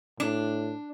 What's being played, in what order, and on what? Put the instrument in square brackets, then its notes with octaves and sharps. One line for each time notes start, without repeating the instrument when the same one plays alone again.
[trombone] A2 [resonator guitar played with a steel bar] D4